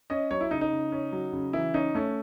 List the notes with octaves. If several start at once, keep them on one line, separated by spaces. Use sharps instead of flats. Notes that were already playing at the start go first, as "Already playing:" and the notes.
C#4 D#5
F#3 C#5
E4
C#3 D#4
D#4
C#3
C#4
F#3
C#3
E3 E4
C#4 D#4
A3 C#4